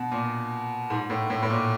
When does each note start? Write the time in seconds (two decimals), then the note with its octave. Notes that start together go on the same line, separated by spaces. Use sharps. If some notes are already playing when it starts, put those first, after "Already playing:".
Already playing: B2
0.11 A#2
0.90 G#2
1.10 A2
1.30 A2
1.42 A2
1.50 A#2